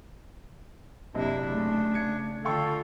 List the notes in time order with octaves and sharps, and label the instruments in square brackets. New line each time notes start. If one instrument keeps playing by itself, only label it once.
[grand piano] F#1 C3 D#5 [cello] A#3 E4 [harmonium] D4
[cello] C#3 A3
[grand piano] G#6 C#7
[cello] D3 F4 [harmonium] A4 [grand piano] F5 G5 C#6